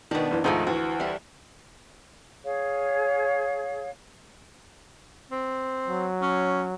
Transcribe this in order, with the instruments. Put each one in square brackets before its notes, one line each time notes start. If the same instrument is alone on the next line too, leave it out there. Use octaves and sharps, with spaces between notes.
[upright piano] B2 D#3 [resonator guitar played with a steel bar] B3 D4
[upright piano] F#1 E3
[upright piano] D2 G#2 F3 [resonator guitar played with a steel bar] D#3 G#3 A3
[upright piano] D2 E3 [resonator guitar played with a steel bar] F#4
[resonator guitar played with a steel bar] G3 E4
[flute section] G#4 C#5 F5
[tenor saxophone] C4
[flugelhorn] F#3
[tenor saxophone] C#4